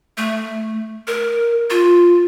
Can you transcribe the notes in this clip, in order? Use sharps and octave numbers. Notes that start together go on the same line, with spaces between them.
A3
A#4
F4